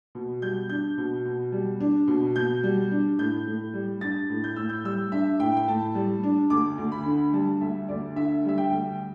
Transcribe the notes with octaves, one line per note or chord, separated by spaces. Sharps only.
B2
G3 G6
D4 G6
B2
B2
G3
D4
B2
B2 G6
G3
D4
A2 G6
A2
G3
D4 A6
A2
G6
A2 E6
G6
G3 E6
D4 E5
A2 G5
G5
A2 A5
G3
D4
D2 D6
D2
B5
D3
G3 A5
D2 E5
D2 D5
D3 E5
G3 E5
G5
D2